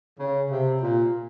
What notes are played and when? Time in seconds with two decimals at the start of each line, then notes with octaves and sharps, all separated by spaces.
0.18 C#3
0.50 C3
0.81 A#2